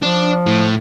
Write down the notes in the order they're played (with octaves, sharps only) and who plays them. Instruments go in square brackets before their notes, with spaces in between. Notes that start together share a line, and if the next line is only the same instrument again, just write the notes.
[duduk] F3 [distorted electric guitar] D4
[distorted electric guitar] A2